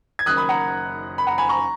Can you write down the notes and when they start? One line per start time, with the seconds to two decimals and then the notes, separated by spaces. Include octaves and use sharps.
0.19 G#6
0.26 F#1 F#2 D#3 D#6 F#6
0.37 B5 D#6
0.49 F#5 A#5
1.18 B5
1.27 F#5 A#5
1.38 G#5 B5
1.49 A#5 C#6